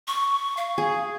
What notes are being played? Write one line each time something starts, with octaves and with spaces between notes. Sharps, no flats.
C#6
F5
G#4